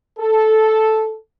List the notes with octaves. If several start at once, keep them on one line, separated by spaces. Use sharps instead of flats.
A4